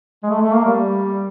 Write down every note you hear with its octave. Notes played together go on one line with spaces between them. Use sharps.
G#3
A3
A3
A#3
G3